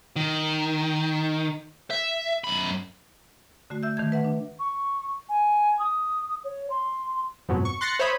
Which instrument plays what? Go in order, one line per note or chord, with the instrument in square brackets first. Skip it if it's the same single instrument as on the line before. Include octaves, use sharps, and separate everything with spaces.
[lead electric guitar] D#3
E5
F#2 B5
[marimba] D3 A3 F#4
E5 E6 G6
D#3 A3 A5 G#6
B4 E5 F#5
D4
[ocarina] C#6
G#5
D#6
C#5
C6
[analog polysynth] F2 G#2 B2 F#3
C#6
C6 F#6 A6 A#6 C7 C#7
C5 C#5 E5 B5 D#6